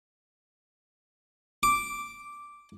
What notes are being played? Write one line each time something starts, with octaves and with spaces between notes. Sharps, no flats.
D6